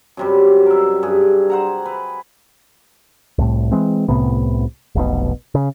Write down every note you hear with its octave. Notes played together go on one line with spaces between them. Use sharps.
F#2 C3 G3
A#4 E5
G2 G#4
C5 F#5 A#5
B4
C2 A2
E3 G#3 C4
C2 A2 C3 B3
F1 B1 B2
C#3